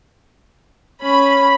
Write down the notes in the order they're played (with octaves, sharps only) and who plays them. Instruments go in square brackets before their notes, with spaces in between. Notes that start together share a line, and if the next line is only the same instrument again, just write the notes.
[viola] C#4 [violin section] B5